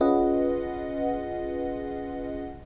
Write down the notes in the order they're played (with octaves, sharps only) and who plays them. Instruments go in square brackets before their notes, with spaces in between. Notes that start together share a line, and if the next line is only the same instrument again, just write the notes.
[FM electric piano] C#4 F4 G#4 B4 D#5 F#5